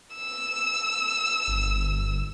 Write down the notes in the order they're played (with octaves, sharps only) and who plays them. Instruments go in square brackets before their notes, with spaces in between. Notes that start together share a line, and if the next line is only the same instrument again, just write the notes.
[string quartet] E6
[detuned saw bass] G1